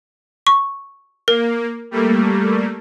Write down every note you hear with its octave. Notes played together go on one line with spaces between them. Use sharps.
C#6
A#3 A#4
G3 A3 A#3